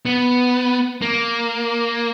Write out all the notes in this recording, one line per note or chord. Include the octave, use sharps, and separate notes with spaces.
B3
A#3